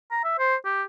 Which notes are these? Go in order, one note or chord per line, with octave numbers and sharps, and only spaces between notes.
A#5
E5
C5
G4